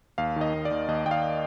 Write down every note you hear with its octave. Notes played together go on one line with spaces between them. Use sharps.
D#2 F5
D#3 D#5
D#2
D5
D#2
D#2 D#5
D#2 G5
F5